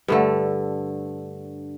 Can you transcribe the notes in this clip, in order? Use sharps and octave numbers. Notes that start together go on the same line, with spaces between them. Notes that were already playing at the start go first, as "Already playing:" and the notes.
G2 D3 A3